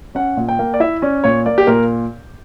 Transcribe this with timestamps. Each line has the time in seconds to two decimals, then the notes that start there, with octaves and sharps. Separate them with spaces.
0.15 C#4 F#5
0.37 A#2
0.49 G5
0.59 A#3
0.74 D5
0.80 E4 E5
1.02 C#4 D5
1.24 A#2 C#5
1.46 A#3 D5
1.58 G4
1.67 A#2 A#4